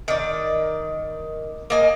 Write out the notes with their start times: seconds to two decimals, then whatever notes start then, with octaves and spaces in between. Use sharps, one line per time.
0.08 D#3 D5
1.70 A#3 D#5 G#5